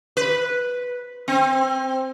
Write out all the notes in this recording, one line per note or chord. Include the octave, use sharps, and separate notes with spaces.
B4
C4